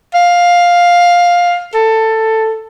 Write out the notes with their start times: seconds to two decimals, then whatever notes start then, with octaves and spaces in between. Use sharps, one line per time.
0.14 F5
1.74 A4